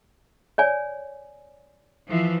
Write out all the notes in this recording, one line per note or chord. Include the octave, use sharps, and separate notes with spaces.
C#5 D5 G#5
E3 F3